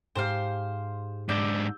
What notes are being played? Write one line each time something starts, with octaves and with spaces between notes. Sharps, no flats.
G#2 G4 C5 F5
G#2 D4 D5 E6 G6